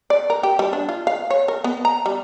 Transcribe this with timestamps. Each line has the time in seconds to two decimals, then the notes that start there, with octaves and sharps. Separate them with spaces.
0.10 D5
0.30 A#4
0.43 G4
0.59 G3
0.73 D4
0.89 F4
1.07 F5
1.30 C#5
1.48 A#4
1.64 B3
1.85 A#5
2.06 G3